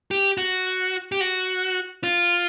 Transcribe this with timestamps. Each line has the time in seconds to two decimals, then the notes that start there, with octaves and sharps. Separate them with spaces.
0.11 G4
0.38 F#4
1.12 G4
1.21 F#4
2.04 F4